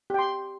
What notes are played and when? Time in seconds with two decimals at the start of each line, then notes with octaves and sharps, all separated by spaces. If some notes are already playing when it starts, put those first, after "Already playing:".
0.10 G4
0.14 G5
0.19 C6